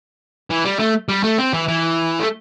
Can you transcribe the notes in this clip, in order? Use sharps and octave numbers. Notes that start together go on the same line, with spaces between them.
E3
G3
A3
G3
A3
C4
E3
E3
A3